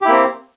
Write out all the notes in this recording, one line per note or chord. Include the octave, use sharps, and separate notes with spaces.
A#3 C4 E4 G4